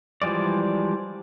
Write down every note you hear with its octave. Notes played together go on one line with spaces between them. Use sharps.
E3 F3 G3 G#3 D5